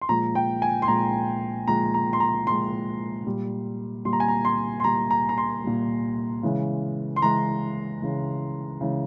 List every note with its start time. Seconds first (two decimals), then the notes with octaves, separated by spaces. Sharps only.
0.02 C6
0.09 A#2 F3 G#3 A#5
0.35 G5
0.62 G#5
0.82 C6
0.88 A#2 F3 G#3 A#5
1.67 A#2 F3 G#3 A#5
1.94 A#5
2.13 C6
2.20 A#5
2.47 A#2 F3 G#3 C6
3.26 A#2 G3
4.05 A#2 G3 C6
4.13 A#5
4.20 G#5
4.28 A#5
4.45 C6
4.80 C6
4.84 A#2 G3 A#5
5.10 A#5
5.29 A#5
5.38 C6
5.64 A#2 G3
6.43 C#3 E3 G#3
7.16 C6
7.22 C#3 E3 G#3 A#5
8.01 C#3 E3 G#3
8.81 C#3 E3 G#3